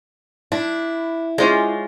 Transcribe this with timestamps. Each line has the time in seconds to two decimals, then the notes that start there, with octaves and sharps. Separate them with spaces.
0.52 D4 E4
1.38 G#3 C#4 F4 G#4 C5 D5